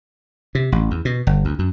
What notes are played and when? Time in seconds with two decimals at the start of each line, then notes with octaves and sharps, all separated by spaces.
0.55 C3
0.72 A1
0.91 E2
1.05 B2
1.27 G1
1.45 D2
1.59 F#2